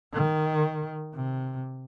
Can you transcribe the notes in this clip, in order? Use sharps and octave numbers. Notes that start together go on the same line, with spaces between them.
D#3
C3